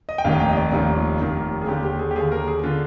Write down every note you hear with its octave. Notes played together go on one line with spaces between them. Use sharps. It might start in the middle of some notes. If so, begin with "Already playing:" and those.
D#5
G5
F1 D#2 D#3 F5
G5
D#5
D5
F1 D#2 D#3 D#4
F4
F1 D#2 D#3
G#4
D#2 D3 G4
G4
G#4
G4
D#2 D3 G#4
A#4
G#4
D3 F4